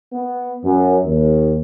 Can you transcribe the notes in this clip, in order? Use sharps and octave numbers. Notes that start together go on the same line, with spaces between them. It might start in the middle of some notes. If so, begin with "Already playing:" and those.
B3
F#2
D#2